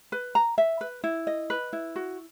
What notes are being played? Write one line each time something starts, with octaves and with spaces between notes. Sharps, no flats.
B4
A#5
E5
B4
E4
D#5
B4
E4
F#4